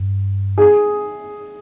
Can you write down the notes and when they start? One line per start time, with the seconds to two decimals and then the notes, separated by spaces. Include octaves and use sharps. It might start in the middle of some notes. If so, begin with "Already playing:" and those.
Already playing: G2
0.58 G#4